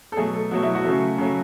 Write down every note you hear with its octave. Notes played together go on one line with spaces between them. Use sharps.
A4
B2 F#3 A3 G#4
A4
B2 F#3 A3 F#4
E4
F#4
C#3 F#3 A3
C#3 F#3 A3